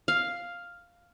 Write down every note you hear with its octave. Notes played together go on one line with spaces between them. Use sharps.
F5